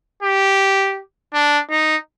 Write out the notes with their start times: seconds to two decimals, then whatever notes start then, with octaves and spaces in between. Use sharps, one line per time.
0.23 G4
1.34 D4
1.70 D#4